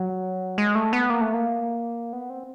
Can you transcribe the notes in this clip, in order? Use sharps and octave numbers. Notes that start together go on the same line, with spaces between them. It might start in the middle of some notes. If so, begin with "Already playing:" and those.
Already playing: F#3
G#3
A3
B3
A#3
A3
A#3
B3
C4